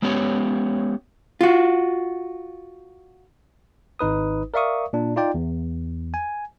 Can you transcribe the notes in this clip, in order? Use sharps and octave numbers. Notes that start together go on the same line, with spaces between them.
G#3 B3 C#4 G4 C#5
F4 F#4
G#1 D#4 B4 D#6
A#4 D5 E5 F5 C#6 D#6
A#2 D4
D#4 F4 D5 G5
E2
G#5